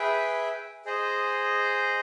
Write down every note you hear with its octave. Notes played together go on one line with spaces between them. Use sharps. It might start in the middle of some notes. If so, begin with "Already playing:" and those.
Already playing: G#4 B4 E5 G5
G#4 C5 D#5